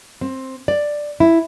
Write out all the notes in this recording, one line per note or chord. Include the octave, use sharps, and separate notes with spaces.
C4
D5
E4